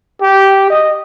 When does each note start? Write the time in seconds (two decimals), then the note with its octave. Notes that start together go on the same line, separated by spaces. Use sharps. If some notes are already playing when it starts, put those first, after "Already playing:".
0.22 G4
0.70 D#5